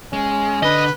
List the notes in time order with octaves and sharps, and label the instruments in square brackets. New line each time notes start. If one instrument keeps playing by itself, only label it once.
[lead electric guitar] G#3 [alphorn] C#4
[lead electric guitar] D3 [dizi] B4 [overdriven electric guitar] D#5